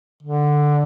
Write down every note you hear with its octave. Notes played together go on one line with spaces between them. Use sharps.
D3